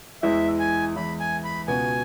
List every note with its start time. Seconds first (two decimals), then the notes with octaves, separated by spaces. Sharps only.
0.23 E2 E3 G#3 E4 E5
0.59 G#5
0.96 E2 E3 G#3 E4 B5
1.20 G#5
1.44 B5
1.68 C#2 B2 B3 F#4 G#5